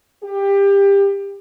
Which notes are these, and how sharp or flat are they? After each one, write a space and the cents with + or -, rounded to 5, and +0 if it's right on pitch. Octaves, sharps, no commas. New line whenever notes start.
G4 +20